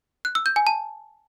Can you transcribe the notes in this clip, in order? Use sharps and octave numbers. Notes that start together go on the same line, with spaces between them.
F#6
E6
G6
G#5
A5